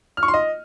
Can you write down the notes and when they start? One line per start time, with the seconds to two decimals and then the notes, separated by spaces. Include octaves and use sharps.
0.17 F6
0.23 C#6
0.28 C6
0.34 D#5